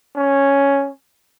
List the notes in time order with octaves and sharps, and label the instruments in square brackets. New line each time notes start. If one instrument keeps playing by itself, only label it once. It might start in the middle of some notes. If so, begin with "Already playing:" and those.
[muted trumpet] C#4